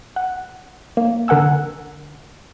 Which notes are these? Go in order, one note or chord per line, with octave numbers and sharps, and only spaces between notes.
F#5
A#3
D3 A#4 F#5 G#5 E6